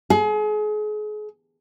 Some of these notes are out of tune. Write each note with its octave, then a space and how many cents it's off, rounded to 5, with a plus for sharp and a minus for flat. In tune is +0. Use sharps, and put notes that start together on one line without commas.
G#4 +35